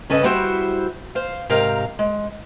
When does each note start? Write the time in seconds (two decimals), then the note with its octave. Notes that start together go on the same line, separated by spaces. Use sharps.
0.10 G2 C#3 C#4 A4 B4 D#5
0.23 G3 E4 F#4 G4 C5 E5
1.15 C5 F5
1.49 G#2 C3 G4 A#4 F5 A#5
1.99 G#3